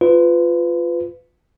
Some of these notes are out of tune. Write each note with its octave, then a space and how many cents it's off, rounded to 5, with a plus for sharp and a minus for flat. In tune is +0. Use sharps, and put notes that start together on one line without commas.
F4 +0 B4 +25